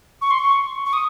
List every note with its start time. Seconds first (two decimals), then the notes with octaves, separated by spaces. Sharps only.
0.21 C#6
0.31 C6
0.39 C#6
0.86 C#6
0.93 D#6